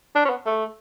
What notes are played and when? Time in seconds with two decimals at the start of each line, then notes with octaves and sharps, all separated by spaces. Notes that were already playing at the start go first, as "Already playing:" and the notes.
0.16 D4
0.25 C#4
0.30 B3
0.46 A3